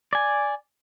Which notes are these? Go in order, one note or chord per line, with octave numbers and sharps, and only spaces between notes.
D5 G#5